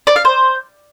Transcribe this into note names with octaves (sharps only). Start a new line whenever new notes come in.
D5
F5
C5